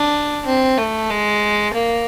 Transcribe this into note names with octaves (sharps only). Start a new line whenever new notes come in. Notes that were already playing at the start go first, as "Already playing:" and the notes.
Already playing: D4
C4
A3
G#3
A#3